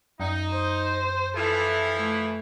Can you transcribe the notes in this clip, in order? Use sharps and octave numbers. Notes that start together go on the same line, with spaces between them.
F#2 D#4
C5
E3 F3 E4 A4
A3